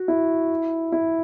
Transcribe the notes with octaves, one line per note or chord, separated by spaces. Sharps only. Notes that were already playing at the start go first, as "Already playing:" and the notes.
Already playing: F#4
E4
E4